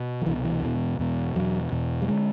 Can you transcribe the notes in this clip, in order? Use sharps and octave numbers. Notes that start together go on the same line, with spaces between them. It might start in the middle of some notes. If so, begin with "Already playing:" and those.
Already playing: B2
F3
C2 B2 E3
E3
E2 B2
E2 B2
E2 B2 F#3
E2 B2
G3
D3 G#3